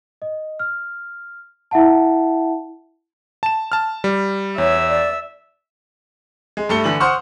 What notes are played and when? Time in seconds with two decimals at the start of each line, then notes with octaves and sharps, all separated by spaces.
0.22 D#5
0.59 F6
1.71 E4 E5 F#5 A5
3.43 A5 E7
3.72 A5 F6
4.04 G3
4.58 E2 C#5 E5
4.89 D5
6.57 G#3
6.69 G2 A3 C#7 G7
6.84 D3 E3 D4 F#7
7.00 C5 F#5 C#6 D#6 F6